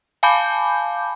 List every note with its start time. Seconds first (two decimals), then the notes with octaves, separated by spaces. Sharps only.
0.23 F5 G#5 A5 B5 D6 G6